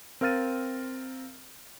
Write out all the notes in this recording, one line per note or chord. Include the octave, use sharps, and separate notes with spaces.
C4 A#4 F5 F6 A6 D#7